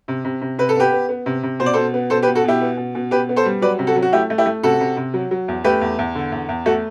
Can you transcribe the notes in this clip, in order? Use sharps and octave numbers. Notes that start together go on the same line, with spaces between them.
C3
C3
C3
C3 B4
A4
B3 G4 B4
B3
B3
C3
C3
B2 C5
D5
B2 A4 C5
B3
B2 A4 C5
G4 B4
B2
F#4 A4
B2 E4 G4
B3
B2
B2
B2 G4 B4
B3
A4 C5
G3
F#3 B4 D5
C3
F#4 A4
F#3
F#4
A3 E4 G4
A3
E4 G4
A3
C3 F#4 A4
C3
C3
F#3
F#3
E2
A3 G4 B4
E2
E2
D3
E2
E2
A3 F#4 A4